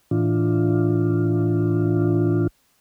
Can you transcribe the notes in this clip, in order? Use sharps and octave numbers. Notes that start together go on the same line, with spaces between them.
A2 E3 D4 F4